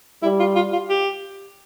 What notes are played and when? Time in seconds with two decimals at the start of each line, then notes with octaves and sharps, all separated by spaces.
0.23 G3 E4
0.40 F4
0.56 F4
0.73 F4
0.90 G4